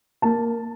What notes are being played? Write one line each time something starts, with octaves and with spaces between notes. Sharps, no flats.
A#3 A5